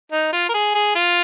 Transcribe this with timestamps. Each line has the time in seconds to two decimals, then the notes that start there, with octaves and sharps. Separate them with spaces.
0.12 D#4
0.33 F4
0.49 A#4
0.54 G#4
0.74 G#4
0.95 F4